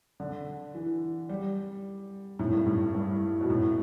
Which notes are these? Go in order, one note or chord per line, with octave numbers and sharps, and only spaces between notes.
D3
E3
G3
A2
G2
A2
G2
B2
A2